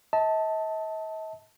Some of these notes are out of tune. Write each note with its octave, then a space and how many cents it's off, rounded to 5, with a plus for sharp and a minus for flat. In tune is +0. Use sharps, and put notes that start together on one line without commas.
D#5 +45 A5 +0